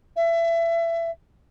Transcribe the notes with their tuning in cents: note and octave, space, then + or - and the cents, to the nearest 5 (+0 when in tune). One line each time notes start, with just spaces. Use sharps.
E5 +25